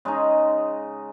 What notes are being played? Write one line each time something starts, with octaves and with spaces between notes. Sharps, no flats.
C#3 G#3 D#4